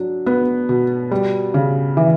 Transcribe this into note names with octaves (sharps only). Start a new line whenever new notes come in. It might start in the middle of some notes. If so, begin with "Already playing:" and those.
Already playing: F#3 D4
B3
B2
G3
C#3
E3